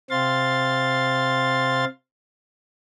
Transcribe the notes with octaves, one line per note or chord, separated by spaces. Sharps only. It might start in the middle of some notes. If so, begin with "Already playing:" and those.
C3 C4 F5 C6 A6